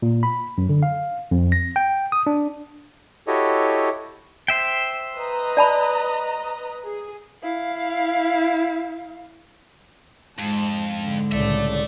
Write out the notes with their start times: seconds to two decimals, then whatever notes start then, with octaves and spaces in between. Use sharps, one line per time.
0.02 A#2
0.23 B5
0.58 F#2
0.69 D3
0.83 F5
1.31 F2
1.52 A#6
1.76 G5
2.12 D#6
2.27 D4
3.27 E4 F#4 G4 A4 C#5 D#5
4.48 C5 E5 G5
5.16 B4 D#5 A#5
5.57 D5 A5 B5
6.85 G#4
7.42 E4 F5
10.39 F2 G#2 A5
11.00 G#2 D3
11.32 C2 A2 C#3 A4 D5 E5